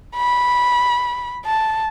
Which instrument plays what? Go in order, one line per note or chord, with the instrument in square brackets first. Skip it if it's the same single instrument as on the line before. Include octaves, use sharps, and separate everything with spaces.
[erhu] B5
A5